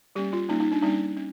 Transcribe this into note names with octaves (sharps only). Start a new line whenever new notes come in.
G3 A#3 C#4 G4
F4
G3 A#3 C#4 D#4
D#4
D4
G3 A#3 C#4 D#4
C#4